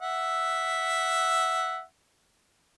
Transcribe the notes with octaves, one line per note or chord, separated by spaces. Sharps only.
E5 F#5